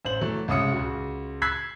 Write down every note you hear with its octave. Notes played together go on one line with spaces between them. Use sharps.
A1 C5 F#7
E3 F#3 A3
C2 C#3 G#3 D#6 C#7
C#2 F#4
E6 F#6 G#6 B6 C7